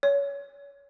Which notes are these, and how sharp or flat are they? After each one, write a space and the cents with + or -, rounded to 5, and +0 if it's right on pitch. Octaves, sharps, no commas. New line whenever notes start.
C#5 +25